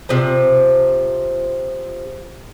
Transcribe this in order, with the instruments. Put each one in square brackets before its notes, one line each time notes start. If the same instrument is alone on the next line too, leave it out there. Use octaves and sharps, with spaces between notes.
[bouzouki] C3 F3